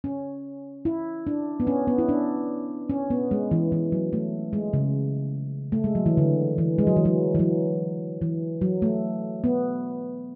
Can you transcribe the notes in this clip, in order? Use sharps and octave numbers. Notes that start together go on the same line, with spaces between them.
C#4
E4
D4
B3
C#4
B3
E4
D4
C#4
B3
G#3
E3
E3
F#3
A3
G#3
C#3
A3
G#3
F#3
E3
D3
E3
G#3
F#3
E3
F#3
E3
F#3
E3
F#3
A3
B3